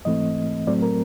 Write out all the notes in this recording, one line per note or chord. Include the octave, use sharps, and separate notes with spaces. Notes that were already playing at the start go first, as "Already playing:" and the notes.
G#2 E3 A3 C4 D#5
A2 F#3 A3 C4 D5
A#4